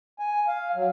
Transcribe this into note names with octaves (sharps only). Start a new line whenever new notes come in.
G#5
F5
F#3